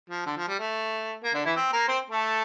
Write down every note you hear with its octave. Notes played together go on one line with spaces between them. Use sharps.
F3
D3
F3
G3
A3
A#3
D3 D4
E3 E4
C4
A#3 A#4
C4 C5
A3 A4